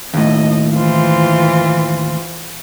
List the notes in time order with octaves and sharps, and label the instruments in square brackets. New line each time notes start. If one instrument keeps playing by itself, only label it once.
[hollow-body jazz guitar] D#2 A2 [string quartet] D#5
[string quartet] E3 F4 C5